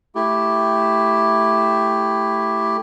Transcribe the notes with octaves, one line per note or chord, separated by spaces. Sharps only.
A3 E4 G4